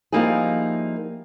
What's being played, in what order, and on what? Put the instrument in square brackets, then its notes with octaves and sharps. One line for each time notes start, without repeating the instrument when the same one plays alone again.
[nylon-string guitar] F3 G3 A#3 D#4 E4 G#4